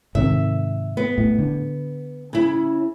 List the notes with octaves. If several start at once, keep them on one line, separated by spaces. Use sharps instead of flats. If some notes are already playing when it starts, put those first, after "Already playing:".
G#2 C3 D#3 E5
B3
A2
D3
C#3 E4